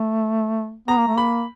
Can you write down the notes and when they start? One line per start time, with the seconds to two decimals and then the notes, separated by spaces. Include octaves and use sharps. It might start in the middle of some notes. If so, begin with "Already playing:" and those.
Already playing: A3
0.88 B3 A#5
0.97 A#3
1.07 A3
1.17 A#3 B5